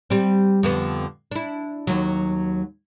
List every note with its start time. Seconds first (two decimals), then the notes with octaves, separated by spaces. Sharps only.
0.10 G3 C4
0.63 F2 D3 B3
1.31 D4 E4
1.87 D#2 F#3